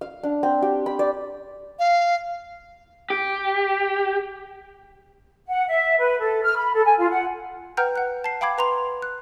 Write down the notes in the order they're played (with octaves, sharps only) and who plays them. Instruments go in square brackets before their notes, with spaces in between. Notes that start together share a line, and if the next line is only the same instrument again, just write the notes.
[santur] F5
D4
C4
G4
B5
D5
[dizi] F5
[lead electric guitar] G4
[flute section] F#5
E5
B4
A4
F6
B5
A4
G#5
F4
F#5
[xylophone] B4 F#5 G5 A#5 F6 G6
F#5 F#6
A5 C7
F5 G5 B5 D6 G#6
B4 A#5 C6 F7
F#6